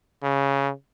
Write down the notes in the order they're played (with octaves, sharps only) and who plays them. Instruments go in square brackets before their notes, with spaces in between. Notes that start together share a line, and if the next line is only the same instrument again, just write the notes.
[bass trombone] C#3